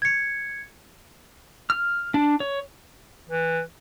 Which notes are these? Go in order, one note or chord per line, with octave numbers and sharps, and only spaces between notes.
G#6 C#7
F6
D4
C#5
E3